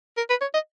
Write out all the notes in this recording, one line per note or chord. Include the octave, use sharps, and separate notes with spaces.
A#4
B4
C#5
D#5